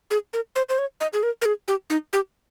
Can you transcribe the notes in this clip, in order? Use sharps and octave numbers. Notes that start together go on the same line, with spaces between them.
G#4
A#4
C5
C5
C#5
D#5
G#4
A#4
A#4
G#4
G4
D#4
G4